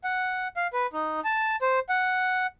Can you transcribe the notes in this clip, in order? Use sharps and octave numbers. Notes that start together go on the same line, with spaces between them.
F#5
F5
B4
D#4
A5
C5
F#5